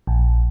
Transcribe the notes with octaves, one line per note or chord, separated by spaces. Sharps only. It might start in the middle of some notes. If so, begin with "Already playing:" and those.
A#1